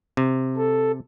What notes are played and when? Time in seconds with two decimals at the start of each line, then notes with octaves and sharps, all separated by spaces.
0.17 C3
0.57 A4